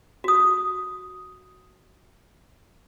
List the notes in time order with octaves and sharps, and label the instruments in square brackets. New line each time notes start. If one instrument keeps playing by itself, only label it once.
[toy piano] F#4 D#6